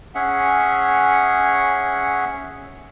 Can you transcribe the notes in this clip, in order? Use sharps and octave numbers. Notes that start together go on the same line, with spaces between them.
C#4 G#4 E5 F#5